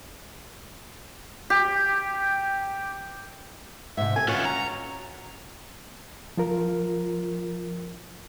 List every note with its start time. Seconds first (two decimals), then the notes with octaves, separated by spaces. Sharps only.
1.50 G4
3.97 G#2 C3 E5
4.16 C4 A4 G#5
4.28 C#4 F4 F#4 B4
4.45 A#5
6.37 F3 F4 A#4